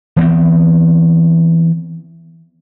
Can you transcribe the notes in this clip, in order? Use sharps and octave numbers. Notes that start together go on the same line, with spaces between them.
E3 B3 C4